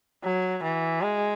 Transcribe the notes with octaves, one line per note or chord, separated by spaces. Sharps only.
F#3
E3
G#3